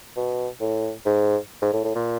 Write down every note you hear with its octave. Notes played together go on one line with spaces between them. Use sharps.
B2
A2
G#2
G#2
A2
A2
A#2